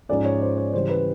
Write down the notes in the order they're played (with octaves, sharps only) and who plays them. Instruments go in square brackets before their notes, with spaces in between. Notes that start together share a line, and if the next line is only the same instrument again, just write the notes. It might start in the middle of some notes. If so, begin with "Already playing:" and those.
[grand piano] G#2 F3 G#3 C#4 D5
C#5
C5
C#5
C#3 E3 G3 C5
B4